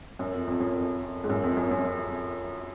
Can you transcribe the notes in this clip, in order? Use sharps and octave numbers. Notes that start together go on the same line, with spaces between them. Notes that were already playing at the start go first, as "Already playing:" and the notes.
F#2
F2
F2
F#2
F2
G#2
F#2
F2
F#2
F#2